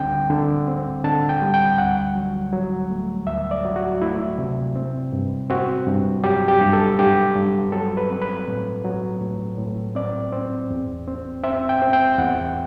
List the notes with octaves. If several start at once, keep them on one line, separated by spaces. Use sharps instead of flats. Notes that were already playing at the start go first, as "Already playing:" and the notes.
Already playing: D2 D3 G3 C4 G5
D3
C4
D3 A5
G5
G3
G5
D2 F#5
F#3
F#3
A3
D2 E5
D5
F#3
F#4
A3 E4
C3
C4
G2
C4 F#4
G2
F#3 G4
G4
G2
A4
G2 G4
G2
F#3 A4
B4
C4
B4
A2
F#3
A2
A2
C4 D5
C4
E2
C4
C4 E5
G5
C4
G5
E2 F#5